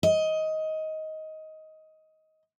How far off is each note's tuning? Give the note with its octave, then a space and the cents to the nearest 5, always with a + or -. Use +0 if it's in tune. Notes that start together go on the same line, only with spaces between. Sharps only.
D#5 +15